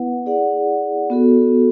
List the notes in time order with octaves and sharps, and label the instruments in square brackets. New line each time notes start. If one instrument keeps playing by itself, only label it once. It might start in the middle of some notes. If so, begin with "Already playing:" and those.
Already playing: [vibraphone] B3 E4 B4 F#5
E4 G#4 D5 F#5
B3 F#4 A4